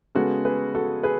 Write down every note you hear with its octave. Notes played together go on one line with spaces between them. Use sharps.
C#3 G#3 B3 F#4 A4
G#4 B4
F#4 A4
G#4 B4